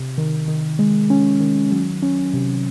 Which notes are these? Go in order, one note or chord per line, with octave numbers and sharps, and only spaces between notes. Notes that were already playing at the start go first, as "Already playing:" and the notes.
Already playing: C3
D#3
D#3
G#3
C#4
D#3
F#3
C#4
C3